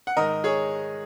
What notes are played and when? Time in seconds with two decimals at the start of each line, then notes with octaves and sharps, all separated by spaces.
0.07 F#5
0.17 G#2 D#3 A#4 D#5
0.44 G#4 C#5